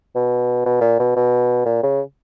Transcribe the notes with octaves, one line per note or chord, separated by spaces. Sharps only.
B2
B2
A#2
B2
B2
A#2
C#3